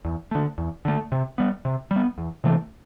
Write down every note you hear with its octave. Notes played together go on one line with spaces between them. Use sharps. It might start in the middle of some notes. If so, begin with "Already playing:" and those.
E2
D3 A3
E2
D3 A3
C3
G3 B3
C3
G3
B3
E2
C3 E3 A3